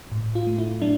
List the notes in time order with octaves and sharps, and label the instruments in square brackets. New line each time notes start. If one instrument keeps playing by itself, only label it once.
[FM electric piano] A2
F4
A3
E4
F#3 D4